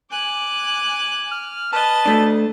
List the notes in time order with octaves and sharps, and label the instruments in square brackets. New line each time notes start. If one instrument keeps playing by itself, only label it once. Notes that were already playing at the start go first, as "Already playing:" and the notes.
[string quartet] G#5 D6 F#6
[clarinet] F6
[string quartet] B4 D#5 A6 [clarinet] A5
[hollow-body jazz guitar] A3 D4